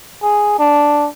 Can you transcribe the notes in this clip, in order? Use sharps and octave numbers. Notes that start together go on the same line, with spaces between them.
G#4
D4